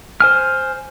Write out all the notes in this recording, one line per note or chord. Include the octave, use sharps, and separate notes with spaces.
C5 G#5 F6